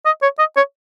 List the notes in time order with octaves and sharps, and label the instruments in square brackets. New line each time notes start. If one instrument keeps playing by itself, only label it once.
[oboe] D#5
C#5
D#5
C#5